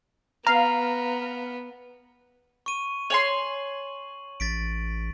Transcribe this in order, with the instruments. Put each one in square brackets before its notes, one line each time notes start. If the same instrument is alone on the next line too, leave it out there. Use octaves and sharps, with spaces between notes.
[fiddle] B3 [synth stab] F5 [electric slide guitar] A#5
[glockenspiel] C#6 D#7
[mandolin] C#5 G#5 C6 [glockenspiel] F#7
[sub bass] A1 [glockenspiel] A6 B6 D7